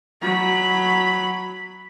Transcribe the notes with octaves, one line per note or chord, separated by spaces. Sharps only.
F#3 B5